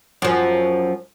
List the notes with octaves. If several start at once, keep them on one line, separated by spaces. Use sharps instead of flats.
F#2 F3